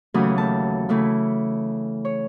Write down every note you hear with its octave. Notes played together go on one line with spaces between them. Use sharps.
D#2 C#3 E3 F#3 A3 D#6
A3 A5
C#3 E3 A3 E4
C#5